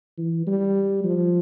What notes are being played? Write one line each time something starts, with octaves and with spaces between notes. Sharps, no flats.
E3
G3
F3